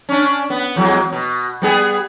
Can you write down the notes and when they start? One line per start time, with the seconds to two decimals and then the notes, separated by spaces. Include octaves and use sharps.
0.09 C#4 D4
0.50 B3
0.76 E2 F#3 G#3
1.13 B2
1.62 G3 B3 G#4